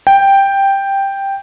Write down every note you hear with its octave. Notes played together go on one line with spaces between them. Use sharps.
G5